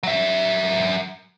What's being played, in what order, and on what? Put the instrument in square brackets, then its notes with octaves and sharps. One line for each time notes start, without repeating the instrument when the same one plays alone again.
[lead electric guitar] F#3 E5